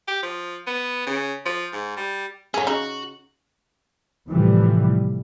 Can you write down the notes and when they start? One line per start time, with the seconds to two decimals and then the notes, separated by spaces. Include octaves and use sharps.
0.08 G4
0.23 F3
0.67 B3
1.06 C#3
1.46 F3
1.73 G#2
1.97 G3
2.54 F#2 F#3 C#4 G#4
2.67 C#3 D#4 F#4
4.29 A2 C3 E3 F3 G3